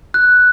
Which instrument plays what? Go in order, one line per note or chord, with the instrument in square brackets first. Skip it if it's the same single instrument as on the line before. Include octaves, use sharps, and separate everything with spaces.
[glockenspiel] F#6